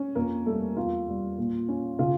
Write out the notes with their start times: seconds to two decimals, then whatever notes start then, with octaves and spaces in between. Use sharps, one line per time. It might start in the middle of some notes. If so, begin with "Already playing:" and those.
Already playing: C#4
0.15 F2 A#3 A#4
0.46 G3 A3 A4
0.77 E2 F4
1.08 G3
1.38 A#2
1.68 C#4
1.99 C#3 F4